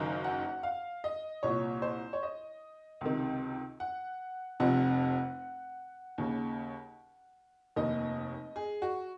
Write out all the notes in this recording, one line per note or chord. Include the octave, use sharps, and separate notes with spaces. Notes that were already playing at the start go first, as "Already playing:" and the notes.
Already playing: F#1 F#2 D#3 F5
F#5
F5
D#5
C2 A#2 C#5
C5
C#5
D#5
C#2 C3 D#3
F#5
F1 F2 C3 F#5
D#2 C#3
F1 D#2 D#3 D#5
G#4
F#4